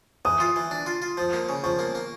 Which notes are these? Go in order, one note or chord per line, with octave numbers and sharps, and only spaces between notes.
E3 D#6
F4
E3
D4
F4
F4
F3
A#3
C#3
F3 C#6
A#3
A#3